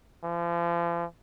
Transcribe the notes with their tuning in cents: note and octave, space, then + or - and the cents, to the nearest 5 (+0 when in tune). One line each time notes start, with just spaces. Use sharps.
F3 -40